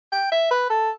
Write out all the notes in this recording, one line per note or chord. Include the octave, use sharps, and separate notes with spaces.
G5
E5
B4
A4